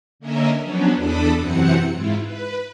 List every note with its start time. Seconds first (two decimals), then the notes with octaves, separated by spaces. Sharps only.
0.19 D3 A#3 C#4 A#4 D#5 E5
0.60 F3 F#3 B3 C#4 D4
0.95 E2 D4 A4 B5 D6 D#6
1.35 F#2 C3 E3 C4 F#5 C#7
1.92 G#2 E4 F4
2.22 B4